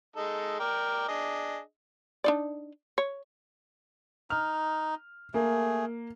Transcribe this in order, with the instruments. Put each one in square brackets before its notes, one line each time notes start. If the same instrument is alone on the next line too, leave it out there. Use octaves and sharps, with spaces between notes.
[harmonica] G#3 D#4 A4
A#4 D5 G5
D4 G#4 D#5
[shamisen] D4 D#4 D5
C#5
[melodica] D#4 [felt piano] F6
[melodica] A3 G#4 [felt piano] A#3